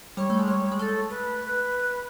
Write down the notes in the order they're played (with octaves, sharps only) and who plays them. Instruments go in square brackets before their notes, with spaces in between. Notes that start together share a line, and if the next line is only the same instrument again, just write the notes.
[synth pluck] G3 [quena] C#5
[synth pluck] A3
G#3
[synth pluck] G3 [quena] C#5
[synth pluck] G#3
[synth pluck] A3 [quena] A4
[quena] B4